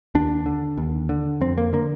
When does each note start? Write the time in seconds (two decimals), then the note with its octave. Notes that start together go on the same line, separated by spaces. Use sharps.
0.15 D#2 D4
0.46 D3
0.77 D#2
1.09 D3
1.41 F2 C4
1.58 A#3
1.73 D3 A#3